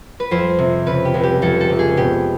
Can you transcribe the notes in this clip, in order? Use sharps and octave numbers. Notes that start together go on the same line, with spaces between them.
B4
F2 C5
C3
C#3 B4
G4
C#2
G4
F2 A4
A4
C3
G#4
B2 G4